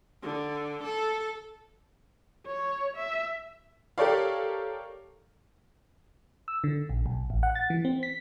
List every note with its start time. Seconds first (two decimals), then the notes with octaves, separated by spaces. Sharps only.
0.22 D3
0.84 A4
2.47 C#5
2.97 E5
3.98 G4 A4 A#4 C#5 D5 F5
6.48 E6
6.64 D3
6.89 A#1
7.06 B1
7.30 A1
7.43 F#5
7.55 A6
7.70 E3
7.85 C4
8.03 B6